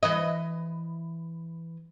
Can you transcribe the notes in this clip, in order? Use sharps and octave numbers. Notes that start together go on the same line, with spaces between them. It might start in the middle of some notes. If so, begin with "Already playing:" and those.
E3 B4 D#5